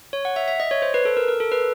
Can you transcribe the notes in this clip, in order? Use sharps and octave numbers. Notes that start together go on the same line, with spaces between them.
C#5
F#5
E5
E5
D#5
C#5
C5
B4
A4
A#4
A#4
A4
B4